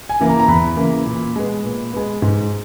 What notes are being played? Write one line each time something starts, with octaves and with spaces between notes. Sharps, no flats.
G#5
C#3 E3 A#3
A#5
A#5
E2 B5
C#3 E3 A#3
A#2
G#3 B3
A#2
G#3 B3
G#2